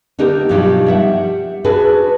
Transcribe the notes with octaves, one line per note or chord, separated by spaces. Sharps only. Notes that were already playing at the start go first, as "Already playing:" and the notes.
D3 A#3 D4 D#4 G4 A#4
G2 B2 F3 F#3 D#4 G4
G3 E5 F#5
D4 F#4 G#4 B4